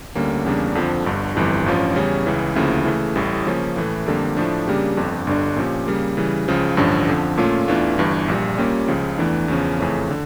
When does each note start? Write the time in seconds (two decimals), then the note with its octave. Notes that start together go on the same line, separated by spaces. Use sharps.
0.15 D2 D3 G3 A#3 C#4
0.45 E2 C#3 G3 A#3 D4
0.75 F2 D3 F3
1.05 G1 G2 D3
1.35 G1 F2 E3 G3
1.66 A1 G2 F3 C#4 F4
1.96 E2 C#3 G3 C#4
2.26 C#2 C#3 E3
2.56 D2 C#3 F3 A#3 E4
2.85 C#3 E3 A3
3.16 A1 A2 G3
3.46 C#3 F3 A#3 C#4
3.76 A2 E3 A3
4.06 F2 D3 G3 A#3
4.37 A2 F3 A3 D4
4.67 C#3 G3 A#3 D4 G4
4.97 G1 F2 D3
5.27 G1 G2 D3 G3 D4
5.56 A#2 F3 C#4 G4
5.87 C#3 G3 A#3
6.17 C#3 E3 G3
6.48 C#2 C#3 F3
6.77 A1 G2 D3 F3 C#4
7.08 F2 D3 F3
7.38 A#2 A3 C#4 F4
7.68 E2 E3 A3 D4 F4
7.98 G1 G2 E3
8.28 A#1 A#2 G3
8.58 A#2 G3 A#3 C#4 G4
8.88 C#2 C#3 F3
9.18 E2 E3 A3 D4
9.48 E2 C#3 F3 C#4
9.79 F2 C#3 E3 A3 C#4
10.10 D3